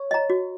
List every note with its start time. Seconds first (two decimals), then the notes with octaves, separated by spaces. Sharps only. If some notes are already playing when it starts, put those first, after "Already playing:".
Already playing: C#5
0.11 D#5 A#5
0.30 F#4